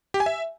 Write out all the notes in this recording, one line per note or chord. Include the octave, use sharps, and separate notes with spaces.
G4
G#5
E5